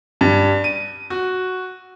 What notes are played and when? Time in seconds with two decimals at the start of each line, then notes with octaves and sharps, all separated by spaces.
0.21 G2
0.64 D#7
1.10 F#4